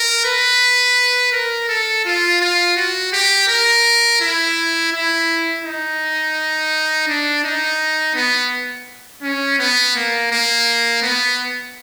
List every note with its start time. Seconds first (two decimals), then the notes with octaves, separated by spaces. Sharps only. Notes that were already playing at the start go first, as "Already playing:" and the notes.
Already playing: A#4
0.25 B4
1.32 A#4
1.68 A4
2.05 F4
2.41 F4
2.76 F#4
3.13 G4
3.48 A#4
4.21 E4
4.93 E4
5.64 D#4
7.08 D4
7.44 D#4
8.15 B3
9.23 C#4
9.59 B3
9.96 A#3
10.31 A#3
11.02 B3